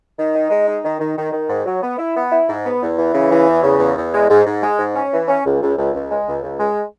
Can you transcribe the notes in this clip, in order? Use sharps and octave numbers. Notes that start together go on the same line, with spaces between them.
D#3
D#4
G#3
D#4
D#3
D#3
D#3
D#3
G#2
F#3
B3
E4
B3
E4
G#2
B3
E2
E3
C#3
E3
E2
C#3
E2
E2
G#3
G#2
G#2
G#3
G#2
C#4
E3
C#4
C#2
C#2
C#2
C#2
G#3
C#2
C#2
G#3